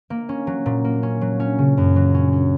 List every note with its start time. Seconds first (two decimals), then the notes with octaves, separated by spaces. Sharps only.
0.10 A#3
0.29 C#4
0.47 F#3
0.66 A#2
0.84 A#3
1.03 C#4
1.21 F#3
1.40 C#4
1.58 C#3
1.77 F#2
1.96 F#3
2.14 C#4
2.32 C#4